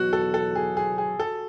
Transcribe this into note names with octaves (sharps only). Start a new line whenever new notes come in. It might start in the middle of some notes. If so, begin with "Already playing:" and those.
Already playing: E2 B2 F#3 F#4
A4
A4
G#4
G#4
G#4
F#4 A4